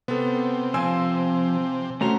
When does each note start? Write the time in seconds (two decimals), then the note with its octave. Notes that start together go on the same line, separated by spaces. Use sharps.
0.08 C3 B3 A4
0.74 F3 C4 G#5 E6
2.01 A3 C#4 F#4 C5 A#5